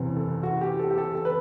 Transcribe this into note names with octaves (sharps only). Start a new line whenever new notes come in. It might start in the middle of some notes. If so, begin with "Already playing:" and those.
Already playing: F#1 E2 C3
A4
F#4
G4
A4
G4
A4
A4
B4